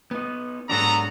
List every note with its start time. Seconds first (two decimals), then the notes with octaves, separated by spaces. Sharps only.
0.11 B3 D#4
0.69 G#2 F#3 B3 D4 A4 A#5